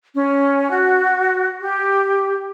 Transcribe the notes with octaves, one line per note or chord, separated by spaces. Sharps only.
C#4
F#4
G4